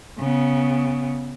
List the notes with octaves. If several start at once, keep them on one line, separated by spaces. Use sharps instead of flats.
C#3 B3